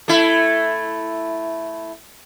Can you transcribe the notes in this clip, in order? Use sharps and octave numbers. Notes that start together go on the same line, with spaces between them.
A3 E4